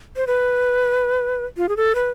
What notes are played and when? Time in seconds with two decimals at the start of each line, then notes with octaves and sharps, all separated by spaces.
0.16 C5
0.27 B4
1.57 F4
1.69 G#4
1.77 A4
1.95 B4